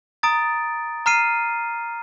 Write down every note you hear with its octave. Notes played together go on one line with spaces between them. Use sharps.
A#5 D#6 A6 D7
A#5 F6 C7 D#7